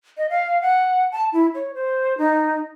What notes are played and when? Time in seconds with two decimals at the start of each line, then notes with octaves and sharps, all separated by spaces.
0.17 D#5
0.30 F5
0.61 F#5
1.12 A5
1.33 E4
1.55 C#5
1.74 C5
2.18 D#4